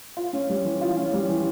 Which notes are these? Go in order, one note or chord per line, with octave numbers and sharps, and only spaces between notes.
F4
C#4
G3
E3
F4
C#4
G3
E3